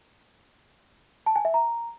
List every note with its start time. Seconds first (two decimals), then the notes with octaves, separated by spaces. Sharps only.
1.26 A5
1.36 G#5
1.45 E5
1.54 A#5